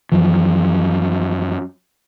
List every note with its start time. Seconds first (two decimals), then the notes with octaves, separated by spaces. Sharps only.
0.12 F#2 E3 F3